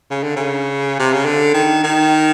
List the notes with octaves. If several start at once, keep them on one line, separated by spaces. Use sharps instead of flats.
C#3
D3
C#3
C3
C#3
D3
D#3
D#3